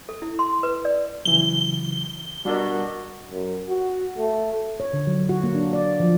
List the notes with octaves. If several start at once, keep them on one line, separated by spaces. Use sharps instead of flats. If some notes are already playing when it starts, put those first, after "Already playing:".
A4
E4
C6
B4
D5
C#3 E3 F#3 G7
B2 G3 D4 F#4 A#4
F#2
F#4
A3
C#5
D3
F#3
F#4
A#3
D4
D5
F3